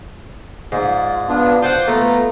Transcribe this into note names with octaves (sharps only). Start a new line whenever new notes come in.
G#2 F4 D5
B3 D4 F4
F4 C5 F#5 D6 G6
A3 B3 F4 A#5